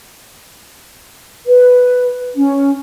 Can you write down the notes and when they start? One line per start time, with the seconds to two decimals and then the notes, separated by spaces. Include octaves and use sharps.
1.46 B4
2.35 C#4